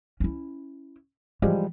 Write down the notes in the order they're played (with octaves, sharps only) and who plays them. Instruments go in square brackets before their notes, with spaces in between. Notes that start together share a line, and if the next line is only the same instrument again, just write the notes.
[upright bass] C#4 E4
[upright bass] E3 [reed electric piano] F3 G3 G#3